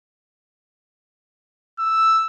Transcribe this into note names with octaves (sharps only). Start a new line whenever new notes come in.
E6